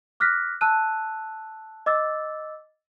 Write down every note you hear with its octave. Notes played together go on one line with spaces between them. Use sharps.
D6 F6 F#6 A#6 B6
A5 E6 F#6 D#7
D#5 D6 E6 A6